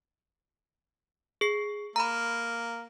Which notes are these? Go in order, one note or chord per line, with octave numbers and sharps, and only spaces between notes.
G#4 C7
A#3 A#5 B5